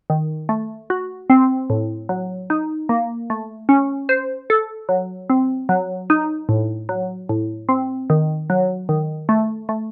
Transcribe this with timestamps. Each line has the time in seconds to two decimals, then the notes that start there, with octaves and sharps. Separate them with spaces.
0.10 D#3
0.49 A3
0.90 F#4
1.30 C4
1.70 A2
2.09 F#3
2.50 D#4
2.89 A#3
3.30 A3
3.69 C#4
4.09 C5
4.50 A4
4.89 F#3
5.30 C4
5.69 F#3
6.10 D#4
6.49 A2
6.89 F#3
7.29 A2
7.69 C4
8.10 D#3
8.50 F#3
8.89 D#3
9.29 A3
9.69 A3